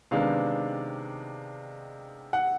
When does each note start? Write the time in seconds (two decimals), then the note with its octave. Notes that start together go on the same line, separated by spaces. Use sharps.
0.11 C3 D#3 G#3 B3 D4 F5
2.33 F#5